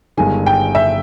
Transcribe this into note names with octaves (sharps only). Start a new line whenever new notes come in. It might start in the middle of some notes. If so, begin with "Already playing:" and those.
G1 G2 D#3 G#3 G#5
G5
E5